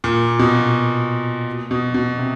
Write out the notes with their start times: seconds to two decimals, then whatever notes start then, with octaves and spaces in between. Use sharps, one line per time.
0.04 A#2
0.39 B2
1.71 B2
1.94 B2
2.18 C3